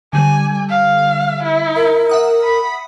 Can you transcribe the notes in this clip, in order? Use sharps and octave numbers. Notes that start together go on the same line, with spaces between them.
D3 G3 G#5
F5
E4
A#4
E5 F#5 D#6
B5